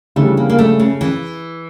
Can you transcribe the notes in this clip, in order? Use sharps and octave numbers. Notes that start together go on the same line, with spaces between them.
C#3 E3 G3 A3 D4
A#3
A#3
A3
C#3
E3